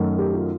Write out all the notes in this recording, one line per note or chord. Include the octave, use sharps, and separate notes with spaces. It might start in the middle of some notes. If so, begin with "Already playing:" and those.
Already playing: F#2 D#3 F#3 A3
G4
F4